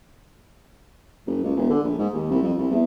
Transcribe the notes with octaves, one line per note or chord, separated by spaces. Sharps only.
F#1
C#2
E1
D3
A#1
G#2
D#2
C2
F2
C2
E2